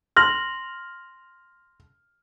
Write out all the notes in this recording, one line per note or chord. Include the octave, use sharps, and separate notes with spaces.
C6 F6 A#6 F#7